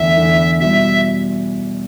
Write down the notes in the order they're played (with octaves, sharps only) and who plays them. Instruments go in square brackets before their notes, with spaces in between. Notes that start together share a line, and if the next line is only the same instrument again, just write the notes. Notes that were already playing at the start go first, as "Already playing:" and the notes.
Already playing: [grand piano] E2 D3 A3 E4 [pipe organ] E5
[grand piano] E2 D3 A3 E4
[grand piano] B2 G3 E4 [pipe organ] E5